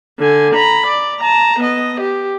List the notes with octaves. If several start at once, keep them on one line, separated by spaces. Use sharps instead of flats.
D3 G#5
A#5 B5
D5
A5 A#5
B3 D#5
G4